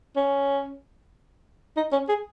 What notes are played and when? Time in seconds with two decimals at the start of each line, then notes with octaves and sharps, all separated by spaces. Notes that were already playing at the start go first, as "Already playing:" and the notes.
0.16 C#4
1.77 D#4
1.92 C#4
2.09 G#4